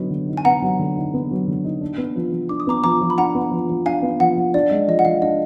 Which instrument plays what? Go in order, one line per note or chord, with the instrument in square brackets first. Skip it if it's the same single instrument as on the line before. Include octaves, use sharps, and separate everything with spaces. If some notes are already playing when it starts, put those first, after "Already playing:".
Already playing: [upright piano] D3 F#3 B3 D#4
D3
D#4
[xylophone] G#5
[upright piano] B3 [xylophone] F#5 A#5
[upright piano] F#3
D3
D#4
B3
F#3
D3
D#4
D4
B3
F3
F3
[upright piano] D4 [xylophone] D6
[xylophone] D#6
[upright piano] B3 [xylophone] A#5 D6
[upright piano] F3 [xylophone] A#5 D6
[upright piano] F3
[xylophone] B5
[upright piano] D4 [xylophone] F#5 A#5
[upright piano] B3
F3
F3
[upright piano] D4 [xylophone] F5 G#5
[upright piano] B3
[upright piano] F3 [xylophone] F#5
[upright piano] F3
[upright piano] D4 [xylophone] D5
[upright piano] G#3 [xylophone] D#5
[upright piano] F3 [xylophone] D#5
[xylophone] F#5
[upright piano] F3 [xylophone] F5
[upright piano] D4 [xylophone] D#5